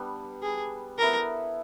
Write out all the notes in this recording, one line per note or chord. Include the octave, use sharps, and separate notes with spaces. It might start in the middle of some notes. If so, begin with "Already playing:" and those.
Already playing: G3 B3 D4
G#4
B3 E4 A4 A#4 D5